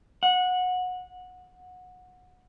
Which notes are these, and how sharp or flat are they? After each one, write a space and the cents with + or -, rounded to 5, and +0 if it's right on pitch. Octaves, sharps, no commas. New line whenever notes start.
F#5 -20